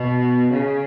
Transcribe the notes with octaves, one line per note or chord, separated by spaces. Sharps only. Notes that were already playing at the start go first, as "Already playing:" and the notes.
Already playing: B2
C#3